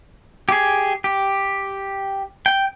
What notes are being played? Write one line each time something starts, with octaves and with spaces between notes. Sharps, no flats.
G4 G#4
G4
G5